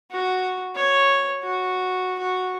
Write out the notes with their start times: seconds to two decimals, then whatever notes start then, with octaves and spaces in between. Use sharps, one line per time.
0.11 F#4
0.75 C#5
1.43 F#4
2.19 F#4